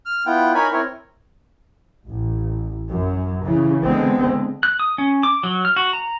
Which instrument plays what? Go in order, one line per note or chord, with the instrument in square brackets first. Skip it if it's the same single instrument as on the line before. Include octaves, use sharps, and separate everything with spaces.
[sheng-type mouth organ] F6
B3 E4 F4 G5
D#4 A#4 C#5 G#5 B5
C4 E4 A#4 C#5
[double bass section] A1
F#2
C#3 E3
D3 G#3 B3 C4
[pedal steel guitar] F#6
D#6
C#4
D6
F#3
F6
F#4
A#5